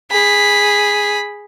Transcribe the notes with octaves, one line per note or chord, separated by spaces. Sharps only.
G#4 B5